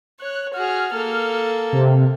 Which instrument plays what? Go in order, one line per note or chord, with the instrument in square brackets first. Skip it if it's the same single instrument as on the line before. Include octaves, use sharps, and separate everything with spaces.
[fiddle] C#5 [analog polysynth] F#6
[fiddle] F#4 G#4 [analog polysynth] F6
[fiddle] A#3 A4
[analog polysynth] C3